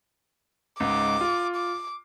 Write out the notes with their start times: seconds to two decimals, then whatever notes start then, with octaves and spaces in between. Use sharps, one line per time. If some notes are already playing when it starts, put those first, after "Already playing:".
0.80 C#2 G#2 D6
1.21 F4
1.56 D6